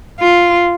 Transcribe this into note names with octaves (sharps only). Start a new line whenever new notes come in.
F4